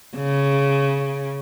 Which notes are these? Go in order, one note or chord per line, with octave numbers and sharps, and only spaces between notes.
C#3